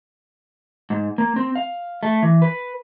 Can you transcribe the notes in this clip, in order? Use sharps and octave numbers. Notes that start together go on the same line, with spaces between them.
G#2
A#3
C4
F5
A3
E3
B4